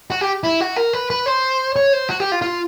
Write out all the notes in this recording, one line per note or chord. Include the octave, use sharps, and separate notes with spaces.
F#4
G4
E4
F#4
A#4
B4
B4
C5
C#5
C5
F#4
G4
F4
F4